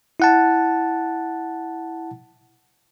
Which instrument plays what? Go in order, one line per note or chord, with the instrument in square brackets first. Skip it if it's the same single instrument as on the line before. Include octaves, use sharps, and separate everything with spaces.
[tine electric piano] E4 F#5 A5